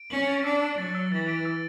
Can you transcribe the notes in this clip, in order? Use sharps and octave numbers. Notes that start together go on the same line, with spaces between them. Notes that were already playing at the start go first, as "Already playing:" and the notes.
Already playing: D7
C#4 F#7
A6
D4 E6
E6
F#3 A6
E6
E3 A6
D7
E6